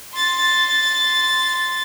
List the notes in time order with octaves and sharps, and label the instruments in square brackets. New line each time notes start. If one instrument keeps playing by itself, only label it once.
[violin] C6 A6